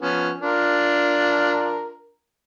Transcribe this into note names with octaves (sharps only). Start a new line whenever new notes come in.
F3 B3 C#4
D4 F4 A#4